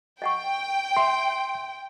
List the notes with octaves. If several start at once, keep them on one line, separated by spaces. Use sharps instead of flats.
D#5 F#5 G5 C#6
E5 C6